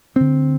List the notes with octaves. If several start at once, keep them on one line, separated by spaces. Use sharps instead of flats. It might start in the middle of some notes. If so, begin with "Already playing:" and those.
D2 D3 C4